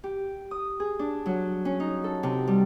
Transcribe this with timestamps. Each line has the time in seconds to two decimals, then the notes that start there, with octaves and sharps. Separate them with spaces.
0.04 G4
0.51 D#6
0.80 G#4
0.99 D4
1.26 F#3
1.65 C#4
1.80 D#4
2.04 A4
2.23 C3
2.48 G3